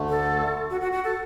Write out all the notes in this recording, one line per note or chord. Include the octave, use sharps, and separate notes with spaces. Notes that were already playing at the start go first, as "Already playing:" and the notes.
Already playing: D2 D3 A3
A4
F#4
F#4
F#4
A4